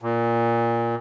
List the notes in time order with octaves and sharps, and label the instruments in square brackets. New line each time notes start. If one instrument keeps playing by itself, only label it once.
[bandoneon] A#2